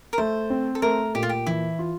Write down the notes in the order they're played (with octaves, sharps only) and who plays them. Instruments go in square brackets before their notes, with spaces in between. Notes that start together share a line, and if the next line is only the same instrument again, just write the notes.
[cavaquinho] A#4
[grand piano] A3 [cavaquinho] C5
[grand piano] C4
[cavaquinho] A4
[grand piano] A3 [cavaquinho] A#4
[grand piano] A#2 [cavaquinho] G4
[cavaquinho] F4
G4
[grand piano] E3 [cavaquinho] E4
[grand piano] F4